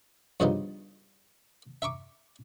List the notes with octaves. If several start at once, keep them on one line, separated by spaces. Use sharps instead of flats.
G2 C#3 F3 B3 D#4 F4
E5 A#5 C#6 D6